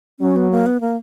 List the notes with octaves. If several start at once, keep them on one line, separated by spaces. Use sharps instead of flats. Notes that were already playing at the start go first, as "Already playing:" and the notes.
F#3 C#4
B3
A#3
B3
A#3